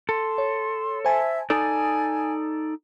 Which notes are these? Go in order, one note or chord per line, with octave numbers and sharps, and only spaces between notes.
A4 C6
C#5
C5 E5 G#5 A5
D#4 A4 D5 G#5 D#6